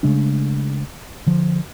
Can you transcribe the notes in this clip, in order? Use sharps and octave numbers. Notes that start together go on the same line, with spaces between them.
C#3 G#3 A3 D4
D3 F3